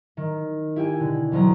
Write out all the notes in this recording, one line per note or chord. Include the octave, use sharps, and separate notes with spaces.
D#3
E4 G4 E5 G5 G#5
B2 D3 F#6
E1 D2 F#3 A#5